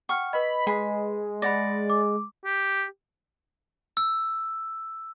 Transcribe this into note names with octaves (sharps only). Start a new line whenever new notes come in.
F#5 G5 C#6 F6
B4 D#5 B5
G#3 G#4 B5
D5 F#5 B5 A#6
D6
G4
E6